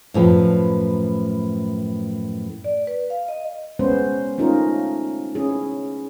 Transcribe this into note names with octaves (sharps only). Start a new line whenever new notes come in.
F#2 A2 F3 B4
D5
B4
F5
D#5
G#3 B3 C#4 C5
A3 C#4 D#4 F4 A#4
C#4 E4 G#4